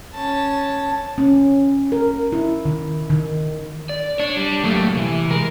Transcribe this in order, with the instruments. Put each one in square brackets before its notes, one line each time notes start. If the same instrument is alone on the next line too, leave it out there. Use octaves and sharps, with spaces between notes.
[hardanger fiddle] C#4 A5
[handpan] C#4
A#4
E4
D#3
D#3
[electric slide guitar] D5
[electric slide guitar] D4 [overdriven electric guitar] C#5
[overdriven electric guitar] G3
[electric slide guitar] F#3 A#3 G4 [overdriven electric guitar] A3
[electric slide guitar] C3 [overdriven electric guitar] E3
[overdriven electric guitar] G#3 [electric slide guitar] A#4